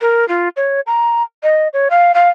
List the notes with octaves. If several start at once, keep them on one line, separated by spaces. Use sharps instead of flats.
A#4
F4
C#5
A#5
D#5
C#5
F5
F5